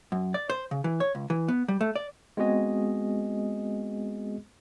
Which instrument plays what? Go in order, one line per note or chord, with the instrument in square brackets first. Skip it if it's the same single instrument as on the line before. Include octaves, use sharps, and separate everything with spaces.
[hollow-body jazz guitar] F#2
D5
C5
C#3
E3
C#5
C#2
E3
B3
G3
A3
D5
[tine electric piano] G#3 B3 C4 F#4 G#4 D#5